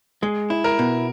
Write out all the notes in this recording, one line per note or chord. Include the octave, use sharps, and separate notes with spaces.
G#3 G#4
E4
A#4
B2